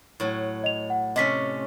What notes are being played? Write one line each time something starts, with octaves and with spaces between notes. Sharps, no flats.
A2 F#3
D#5 F7
F#5
C3 A3 C#4 D#5 B6